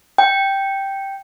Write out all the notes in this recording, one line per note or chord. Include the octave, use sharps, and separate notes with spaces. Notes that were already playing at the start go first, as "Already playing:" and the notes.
G5